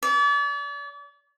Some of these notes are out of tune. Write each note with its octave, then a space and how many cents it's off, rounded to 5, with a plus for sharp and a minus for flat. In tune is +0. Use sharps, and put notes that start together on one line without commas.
D5 -40